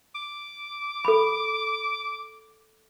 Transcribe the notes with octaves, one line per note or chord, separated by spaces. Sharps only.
D6
A4 B5